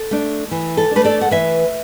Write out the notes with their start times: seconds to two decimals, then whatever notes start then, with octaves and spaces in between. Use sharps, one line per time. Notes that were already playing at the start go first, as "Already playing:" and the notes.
Already playing: A4
0.11 A3 D4
0.51 E3
0.77 A4
0.91 A3 D4 B4
1.05 A4 D5
1.21 F#5
1.31 E3 B4 E5